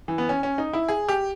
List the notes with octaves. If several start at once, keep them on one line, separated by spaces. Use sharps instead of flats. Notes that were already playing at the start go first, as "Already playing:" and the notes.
E3
B3
C#4
C#4
D#4
E4
G#4
G4